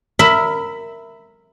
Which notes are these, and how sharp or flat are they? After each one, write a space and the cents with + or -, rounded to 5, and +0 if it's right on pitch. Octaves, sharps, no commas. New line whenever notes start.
A#4 -10 E5 +0 B5 +15